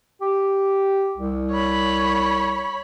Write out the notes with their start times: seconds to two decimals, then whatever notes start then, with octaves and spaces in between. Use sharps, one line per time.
0.22 G4
1.17 C2
1.51 C#5 B5